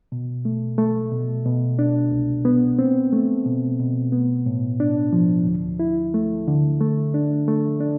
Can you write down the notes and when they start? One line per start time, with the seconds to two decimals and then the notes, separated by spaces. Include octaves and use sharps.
0.12 B2
0.45 A3
0.78 A3
1.12 B2
1.46 B2
1.79 D4
2.12 C2
2.45 B3
2.79 C4
3.13 A3
3.46 B2
3.80 B2
4.12 B3
4.46 A2
4.80 D4
5.13 F3
5.47 D2
5.79 E4
6.14 A3
6.48 D3
6.80 A3
7.14 D4
7.48 A3
7.80 D4